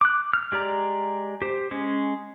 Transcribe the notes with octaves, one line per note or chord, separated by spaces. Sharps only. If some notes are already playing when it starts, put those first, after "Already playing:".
D6 F#6
F6
G#3 G4 D5 A#5
G4 C5
G#3 C#4